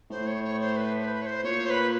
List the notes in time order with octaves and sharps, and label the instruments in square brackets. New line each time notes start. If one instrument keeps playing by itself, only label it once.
[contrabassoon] A2 [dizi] C5
[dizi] C#5
C#5
C5
B4
C5
B4
C#5
C5
[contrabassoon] A#2 [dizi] C#5
[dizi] C5
B4